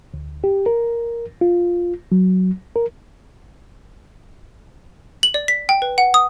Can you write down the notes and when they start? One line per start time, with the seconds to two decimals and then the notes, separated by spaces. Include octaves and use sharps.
0.14 D2
0.44 G4
0.66 A#4
1.41 F4
2.12 F#3
2.76 A#4
5.23 F#7
5.34 D5
5.48 B6
5.69 G5
5.82 B4
5.98 F#5
6.14 D#6